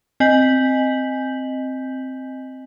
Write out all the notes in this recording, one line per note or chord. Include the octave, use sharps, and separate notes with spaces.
C4 D#5 G#5 G6 B6 F#7